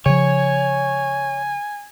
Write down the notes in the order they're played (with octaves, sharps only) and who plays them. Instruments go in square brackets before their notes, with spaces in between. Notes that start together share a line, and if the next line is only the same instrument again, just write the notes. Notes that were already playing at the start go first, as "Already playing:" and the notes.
[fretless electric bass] C#3 F3 [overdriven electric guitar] C#5 [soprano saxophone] G#5